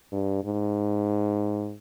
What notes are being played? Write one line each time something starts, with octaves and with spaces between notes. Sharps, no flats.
G2
G#2